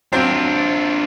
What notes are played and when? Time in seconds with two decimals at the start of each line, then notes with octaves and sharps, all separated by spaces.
0.12 F#3 C4 D4 F4